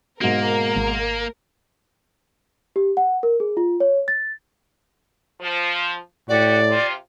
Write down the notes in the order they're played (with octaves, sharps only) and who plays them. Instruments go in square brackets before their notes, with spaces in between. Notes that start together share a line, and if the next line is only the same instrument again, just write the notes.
[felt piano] G#2 B2 [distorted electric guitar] A#3 [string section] A#4
[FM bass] G#1
[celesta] G4
F#5
A#4
G#4
F4
C#5
A6
[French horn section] F3
[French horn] A2 [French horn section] F#4 G4 [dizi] D5
[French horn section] C3 F4